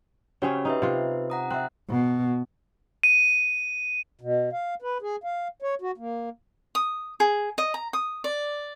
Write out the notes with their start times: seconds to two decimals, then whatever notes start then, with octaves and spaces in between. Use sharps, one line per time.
0.42 C#3 C4 C#4 F#4 G4 C#5
0.65 D#4 G4 B4 E5
0.82 C3 F4
1.30 F#5 A#5 D#6
1.51 C4 E5 F#6
1.90 B2
3.03 D#7
4.21 B2
4.53 F5
4.82 B4
5.02 G#4
5.24 F5
5.62 C#5
5.82 F#4
5.98 A#3
6.75 D#6
7.20 G#4
7.58 D#5
7.74 A#5
7.93 D#6
8.24 D5